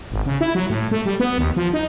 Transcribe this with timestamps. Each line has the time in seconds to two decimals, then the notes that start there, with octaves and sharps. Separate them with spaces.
0.12 G#1
0.26 C#3
0.41 E4
0.55 F#3
0.69 A2
0.91 A3
1.05 G3
1.20 B3
1.38 D#2
1.56 F3
1.73 D#4